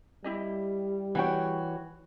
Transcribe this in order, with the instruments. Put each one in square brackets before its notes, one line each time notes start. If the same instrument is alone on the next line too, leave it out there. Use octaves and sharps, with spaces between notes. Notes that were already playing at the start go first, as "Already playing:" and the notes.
[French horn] G3 [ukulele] E4 G4 D#5
[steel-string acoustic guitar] E3 F#4 C#5 [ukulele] F#5 G5